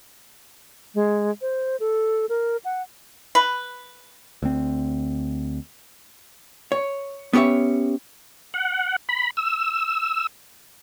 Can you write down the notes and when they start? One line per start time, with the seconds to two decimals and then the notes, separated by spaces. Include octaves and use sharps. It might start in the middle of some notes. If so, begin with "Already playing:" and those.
0.95 G#3
1.42 C5
1.80 A4
2.29 A#4
2.65 F#5
3.35 B4
4.43 D2 C4
6.72 C#5
7.33 B3 C#4 G4 C#5 E5
8.54 F#5
9.09 B5
9.37 E6